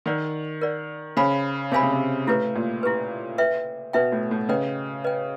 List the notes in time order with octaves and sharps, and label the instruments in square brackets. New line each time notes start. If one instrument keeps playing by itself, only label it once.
[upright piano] D#3 [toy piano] A#4 D5 F#5
[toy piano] A#4 D5 F#5
[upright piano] C#3 [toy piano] G#4 C5 F5 G#5 B5
[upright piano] C3 [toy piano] G#4 C5 F5 G#5 B5
[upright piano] C#3
C3
[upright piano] A2 [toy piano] E4 G4 B4
[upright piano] A#2
[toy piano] E4 G4 B4
B4 E5 G5
[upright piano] B2 [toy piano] B4 E5 G5
[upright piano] A2
A2
[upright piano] C#3 [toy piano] B4 D#5 G5
[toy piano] B4 D#5 G5